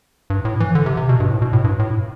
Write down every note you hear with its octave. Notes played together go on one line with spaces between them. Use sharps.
G2
A2
E3
D3
C3
C3
B2
G2
A2
B2
A2
G2
A2